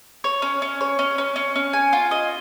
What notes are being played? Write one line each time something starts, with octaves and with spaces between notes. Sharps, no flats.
C#5
C#4
C#4
C#5
C#4
C#4
C#4
C#4
G#5
F4
D#5